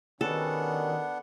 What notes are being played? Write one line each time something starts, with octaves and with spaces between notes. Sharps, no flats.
B2 D#3 G3 B3 C#4 D4 A4 F#5